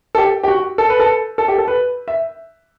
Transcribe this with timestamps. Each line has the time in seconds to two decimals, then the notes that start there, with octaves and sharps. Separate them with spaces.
0.15 A4
0.18 G4
0.44 G4
0.48 F#4
0.78 A4
0.90 B4
1.00 A4
1.38 A4
1.48 G4
1.58 A4
1.68 B4
2.08 E5